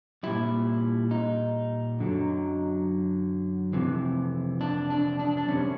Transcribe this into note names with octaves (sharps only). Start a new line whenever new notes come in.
A#2 G3 E4
D#4
F#2 D3 F#3
F2 C3 E3
D4
D4
D4
D4
F2 C3 D#3 G3 C#4